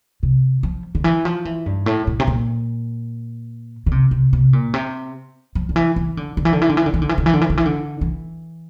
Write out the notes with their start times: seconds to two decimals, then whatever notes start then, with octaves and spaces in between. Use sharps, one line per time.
0.23 C3
0.63 F3
0.95 D3
1.04 E3
1.25 F3
1.45 E3
1.66 G2
1.86 A2
2.07 A2
2.20 C3
2.27 A#2
3.86 D3
3.91 C3
4.11 C3
4.33 C3
4.53 A#2
4.74 C3
5.55 F3
5.69 D3
5.76 E3
5.96 E3
6.17 D3
6.37 D3
6.45 E3
6.53 D3
6.62 E3
6.69 D3
6.77 E3
6.86 D3
6.94 E3
7.02 D3
7.09 E3
7.18 D3
7.26 E3
7.33 D3
7.41 E3
7.50 D3
7.57 E3
7.66 D3
8.01 E3